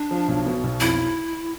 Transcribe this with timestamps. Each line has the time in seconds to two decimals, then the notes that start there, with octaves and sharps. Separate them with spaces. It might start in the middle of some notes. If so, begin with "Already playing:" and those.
Already playing: D4
0.11 F3
0.28 B1
0.46 B2
0.64 B1
0.80 F2 E4